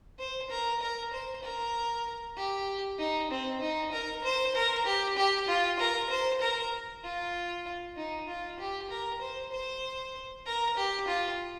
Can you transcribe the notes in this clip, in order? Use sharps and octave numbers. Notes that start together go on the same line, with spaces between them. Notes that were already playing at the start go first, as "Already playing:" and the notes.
C5
A#4
A#4
C5
A#4
G4
D#4
C4
D#4
A#4
C5
A#4
G4
G4
F4
A#4
C5
A#4
F4
D#4
F4
G4
A#4
C5
C5
A#4
G4
F4